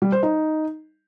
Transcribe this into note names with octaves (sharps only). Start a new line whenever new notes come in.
G3
C5
D#4